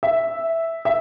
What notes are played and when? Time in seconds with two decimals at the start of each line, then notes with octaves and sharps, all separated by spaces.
0.03 E5
0.85 E5